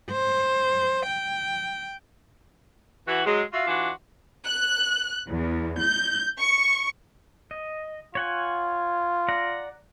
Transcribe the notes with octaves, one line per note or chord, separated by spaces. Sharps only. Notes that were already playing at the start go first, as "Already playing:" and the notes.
C5
G5
E3 F#4
F#3 G#3
F4 F#4 E5 F5
E3 D4 F4 F#4
F#6
E2
G6
C#6
D#5
F4 C#5 F#5 G#5
D5 F#5 A#5